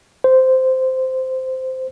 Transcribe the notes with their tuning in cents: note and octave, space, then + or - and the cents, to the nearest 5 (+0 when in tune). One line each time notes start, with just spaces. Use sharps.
C5 -10